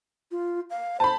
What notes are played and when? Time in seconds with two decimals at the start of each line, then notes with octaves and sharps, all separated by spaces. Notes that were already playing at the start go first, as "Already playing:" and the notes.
0.31 F4
0.70 F5
1.00 C5 A5 B5